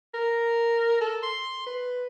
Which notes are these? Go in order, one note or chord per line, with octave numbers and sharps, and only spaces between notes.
A#4
A4
C6
B4